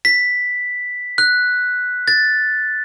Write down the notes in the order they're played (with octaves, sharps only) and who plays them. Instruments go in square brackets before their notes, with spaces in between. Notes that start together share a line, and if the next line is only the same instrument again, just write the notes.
[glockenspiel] B6
F#6
A6